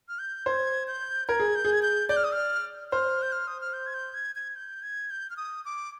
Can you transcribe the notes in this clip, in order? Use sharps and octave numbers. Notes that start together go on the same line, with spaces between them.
F6
G6
C5 G#6
G6
A#4 G#6
G#4
G6
G#4
G#6
G6
D5 G6
F6
D#6
F6
C5 F6
G6
F6
D#6
F6
G6
G#6
G6
G#6
G#6
G6
G#6
G6
F6
D#6
D6